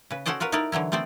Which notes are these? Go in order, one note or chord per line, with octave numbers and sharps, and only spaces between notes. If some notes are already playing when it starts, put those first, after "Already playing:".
C#3 B4
C#4 F#4 A4 C5 D5 D#5
F4 F#4 A#4 B4
D#4 E4 A4 A#4 D5
D3 E3 F#3 E4
A3 B3 C4 C5 D5